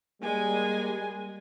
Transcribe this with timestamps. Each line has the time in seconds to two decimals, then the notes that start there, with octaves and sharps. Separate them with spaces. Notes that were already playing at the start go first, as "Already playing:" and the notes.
0.22 G3 G#3 A#3 G#5